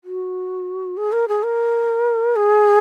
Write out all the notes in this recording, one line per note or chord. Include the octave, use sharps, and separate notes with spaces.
F#4
G#4
A#4
G#4
A#4
G#4